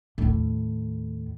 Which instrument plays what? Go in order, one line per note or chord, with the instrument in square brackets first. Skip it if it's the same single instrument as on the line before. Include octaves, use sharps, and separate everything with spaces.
[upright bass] D#2 A2